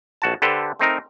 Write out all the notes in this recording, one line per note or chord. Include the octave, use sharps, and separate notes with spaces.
A#1 F#4 A5
D3 G4 A4 B4 C5
A3 C4 D#4 A#4